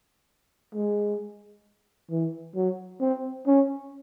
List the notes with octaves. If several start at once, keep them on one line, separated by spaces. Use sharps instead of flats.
G#3
E3
F#3
C4
C#4